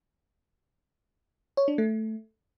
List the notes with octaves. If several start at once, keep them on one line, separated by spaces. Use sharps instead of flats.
C#5
D4
A3